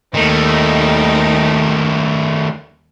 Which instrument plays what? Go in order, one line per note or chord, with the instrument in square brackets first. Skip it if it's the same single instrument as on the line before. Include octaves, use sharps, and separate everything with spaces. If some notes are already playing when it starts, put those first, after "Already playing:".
[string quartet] D#2 G3 D#4 [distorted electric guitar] D#3 A3